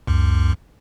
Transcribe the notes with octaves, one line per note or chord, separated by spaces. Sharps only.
C#2 F#2